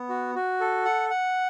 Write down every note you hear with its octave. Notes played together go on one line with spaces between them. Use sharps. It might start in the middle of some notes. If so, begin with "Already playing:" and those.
Already playing: B3
F#4
F#4
A4
F#5
F#5